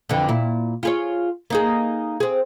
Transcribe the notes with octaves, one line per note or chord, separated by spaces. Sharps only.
F2 D3 E3
A#2 E4
F4 G#4 C#5
A#3 D#4 G#4
C4 G#4